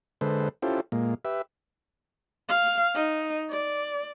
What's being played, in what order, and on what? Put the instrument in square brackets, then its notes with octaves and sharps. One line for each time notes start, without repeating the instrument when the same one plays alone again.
[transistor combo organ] D3 G#3 A4 B4 C5
C#4 E4 F4 G4 A4 C5
A#2 G#3 A#3
G4 B4 E5
[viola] F5
D#4
D5